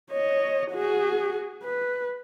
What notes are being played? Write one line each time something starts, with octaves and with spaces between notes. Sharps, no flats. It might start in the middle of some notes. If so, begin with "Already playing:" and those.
C#5 D#5
F#4 G#4
B4